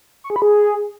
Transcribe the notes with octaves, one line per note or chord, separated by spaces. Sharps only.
C#6
G#4
B5
G#4